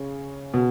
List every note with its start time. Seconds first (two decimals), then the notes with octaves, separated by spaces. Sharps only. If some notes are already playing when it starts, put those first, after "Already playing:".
Already playing: C#3
0.54 B2